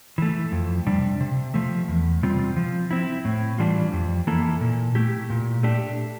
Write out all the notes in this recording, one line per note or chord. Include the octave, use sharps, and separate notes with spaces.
E3 A3
F2
C3 G3 D4
C3
F3 A3
E2
C3 G3 C4 F4
F3
C4 E4
A2
E3 G3 D4 F4
F2
E3 A#3 E4 A4
A#2
A3 E4 G4
A#2
A3 D4 G4